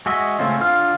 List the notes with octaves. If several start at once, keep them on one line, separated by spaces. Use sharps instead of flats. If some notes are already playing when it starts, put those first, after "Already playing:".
G#3 F#4 D#5 E5
C#3 A3 C4 C#4 F4
D3 F4 F5 F6